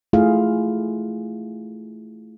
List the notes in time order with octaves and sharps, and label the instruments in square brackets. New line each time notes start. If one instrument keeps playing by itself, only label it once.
[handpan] A3 E4 F4 G#4 F5